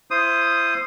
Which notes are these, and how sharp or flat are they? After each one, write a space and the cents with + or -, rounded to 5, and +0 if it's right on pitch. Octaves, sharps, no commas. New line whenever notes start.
E4 +35 C5 +0 D#6 +0